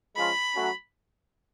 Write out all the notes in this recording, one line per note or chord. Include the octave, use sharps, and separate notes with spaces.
F3 G#3 C#4 F4 B5
F#3 A3 C#4 F#4